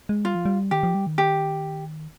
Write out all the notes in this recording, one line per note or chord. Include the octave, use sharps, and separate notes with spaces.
G#3
G3 F4
F3
G3
D#3 G4
F3
G3
D#3
G4